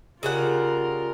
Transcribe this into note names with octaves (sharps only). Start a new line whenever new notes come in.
C#3 G3 F4 A#4 F#5